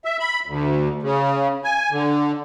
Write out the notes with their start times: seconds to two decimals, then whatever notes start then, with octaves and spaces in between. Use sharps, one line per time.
0.05 E5
0.20 B5
0.46 D2
1.02 C#3
1.64 G#5
1.91 D3